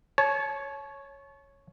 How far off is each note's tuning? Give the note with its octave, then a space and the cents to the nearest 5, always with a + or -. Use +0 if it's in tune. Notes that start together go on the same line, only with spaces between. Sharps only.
C#5 +0 A5 -35